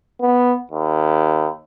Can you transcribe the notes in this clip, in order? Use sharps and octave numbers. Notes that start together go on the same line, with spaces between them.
B3
D#2